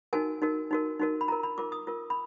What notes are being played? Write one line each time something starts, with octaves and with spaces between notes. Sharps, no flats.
D#4 F#4 A#4 G#5
D#4 F#4 A#4
D#4 F#4 A#4
D#4 F#4 A#4
B5
F4 A#4 A#5
B5
F4 A#4 D6
D#6
F4 A#4
B5